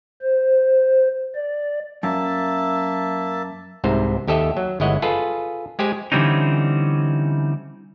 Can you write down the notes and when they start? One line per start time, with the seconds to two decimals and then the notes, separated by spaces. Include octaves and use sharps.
0.22 C5
1.35 D5
2.03 F#2 A#3 E5 A5
3.84 C2 G#2 C3 C5
4.28 D#2 G4 A4 D#5 E5
4.57 F#3
4.80 G1 G#3 E4 C#5 D#5 F#5
5.02 F4 G#4 A4 B4
5.79 G#3 G4 G#4 C5 G#5
6.12 D3 E3 G3 C4 C#4 D#4